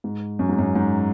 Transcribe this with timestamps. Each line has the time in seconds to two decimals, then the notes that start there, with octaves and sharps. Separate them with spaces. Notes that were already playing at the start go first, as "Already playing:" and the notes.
0.04 G#2
0.39 F#2
0.49 G#2
0.59 F#2
0.75 G#2